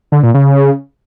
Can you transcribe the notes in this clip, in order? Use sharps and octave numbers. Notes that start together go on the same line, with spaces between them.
D3
A#2
C#3